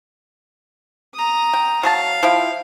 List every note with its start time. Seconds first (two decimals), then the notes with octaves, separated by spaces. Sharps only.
1.14 A#5 D#6
1.53 G5
1.83 F#3 G#4 F5 A5
2.23 F3 E4 G5